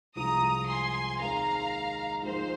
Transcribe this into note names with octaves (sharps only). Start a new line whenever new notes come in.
C2 C3 F3 G#3 F4 A#5 D#6
G#5 C6
D#2 D#3 G#3 C4 F5 A#5
G#2 F3 A#3 F4 G#4 C5